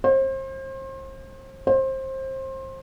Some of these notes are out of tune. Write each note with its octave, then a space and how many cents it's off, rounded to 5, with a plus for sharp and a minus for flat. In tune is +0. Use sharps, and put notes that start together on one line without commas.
C5 +35
C5 +25